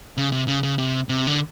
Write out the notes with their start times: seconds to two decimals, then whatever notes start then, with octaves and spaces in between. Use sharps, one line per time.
0.18 C#3
0.32 C3
0.48 C#3
0.63 C#3
0.78 C3
1.09 C3
1.27 D3